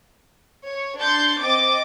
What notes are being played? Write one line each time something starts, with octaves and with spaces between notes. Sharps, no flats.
C#5
D4 C6 G6 A6 C#7
C4 D#5 D6 A6 D7